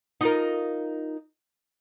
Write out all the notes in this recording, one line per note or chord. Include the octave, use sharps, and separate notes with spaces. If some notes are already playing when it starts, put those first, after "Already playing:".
D#4 F4 A#4